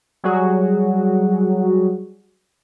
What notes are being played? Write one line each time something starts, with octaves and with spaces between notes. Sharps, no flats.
F#3 G3 F#4 G#4